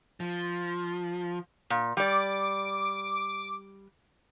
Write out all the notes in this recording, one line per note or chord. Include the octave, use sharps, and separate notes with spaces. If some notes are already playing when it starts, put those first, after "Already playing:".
F3
A#2
G3 D5 D6